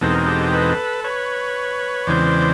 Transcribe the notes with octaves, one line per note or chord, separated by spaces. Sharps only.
E2 B2 G#3 C4 D#4 A4
A#4
G4 A4
A4 B4
B4 C#5
E2 C#3 E3 G#3 C4 C5 D5